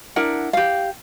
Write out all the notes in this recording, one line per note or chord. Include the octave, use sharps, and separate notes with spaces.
D4 E4 A#4 F#5
G4 F5